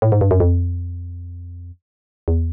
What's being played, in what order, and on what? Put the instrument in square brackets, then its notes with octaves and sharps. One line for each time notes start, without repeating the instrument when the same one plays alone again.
[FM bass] A2
G#2
G2
F#2
F2
E2